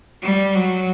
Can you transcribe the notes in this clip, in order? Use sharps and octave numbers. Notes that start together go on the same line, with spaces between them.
G3
F#3